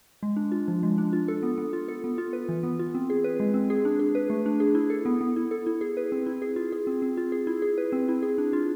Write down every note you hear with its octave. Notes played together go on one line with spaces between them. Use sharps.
G#3
D4
F4
F3
G#3
D4
F4
A4
B3
B3
F4
A4
B3
F4
B4
E3
B3
F4
C4
G#4
B4
G#3
C4
G#4
D4
G#4
B4
A3
D4
G#4
E4
A4
B3
B3
E4
A4
E4
G#4
B4
C4
E4
G#4
F4
G#4
C4
C4
F4
G#4
E4
G#4
B4
C4
E4
G#4
D4
F4